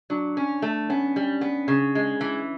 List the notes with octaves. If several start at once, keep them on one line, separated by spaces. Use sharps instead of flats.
F#3 D4
C#4
A3
B3 C#4
G3
B3
C#3
G#3
E3